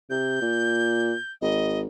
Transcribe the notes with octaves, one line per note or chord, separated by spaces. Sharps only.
C3 G6
A#2
G#1 D#5